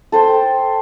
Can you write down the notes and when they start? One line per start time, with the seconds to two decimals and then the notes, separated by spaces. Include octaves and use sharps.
0.12 A4 C5 G5